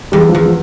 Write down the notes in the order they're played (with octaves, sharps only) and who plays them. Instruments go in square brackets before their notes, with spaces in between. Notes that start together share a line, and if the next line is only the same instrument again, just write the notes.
[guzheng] E2 [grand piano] G3
[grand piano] F3
[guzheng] E2
[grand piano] F3